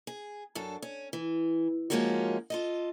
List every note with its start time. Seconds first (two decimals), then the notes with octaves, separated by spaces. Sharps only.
0.07 G#4
0.55 F#2 D4 A4
0.82 C#4
1.13 E3
1.90 F3 G#3 A#3 C#4 D#4 F#4
2.50 F4 A4 D#5